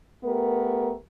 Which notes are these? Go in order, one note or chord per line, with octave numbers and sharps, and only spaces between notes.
A3 B3 G4 A#4